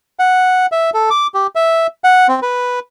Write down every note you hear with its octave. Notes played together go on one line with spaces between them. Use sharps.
F#5
E5
A4
D6
G4
E5
F#5
C4
B4